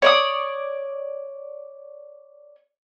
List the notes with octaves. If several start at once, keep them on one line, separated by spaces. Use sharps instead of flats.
C#5 D5 D#6